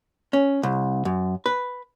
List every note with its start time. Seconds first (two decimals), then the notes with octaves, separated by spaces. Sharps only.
0.33 C#4
0.63 C2
1.05 F#2
1.46 B4